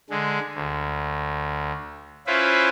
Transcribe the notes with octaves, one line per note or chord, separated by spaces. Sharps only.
D3 G#3
D2
C#4 E4 F4 B4 C5